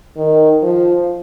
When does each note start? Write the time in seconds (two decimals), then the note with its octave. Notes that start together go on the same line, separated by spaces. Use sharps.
0.17 D#3
0.63 F3